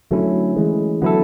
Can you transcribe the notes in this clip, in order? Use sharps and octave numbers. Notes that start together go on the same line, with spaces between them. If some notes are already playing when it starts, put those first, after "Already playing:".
D3 F#3 A3 C#4 E4
E3 G#3
D3 F#3 B3 E4 A4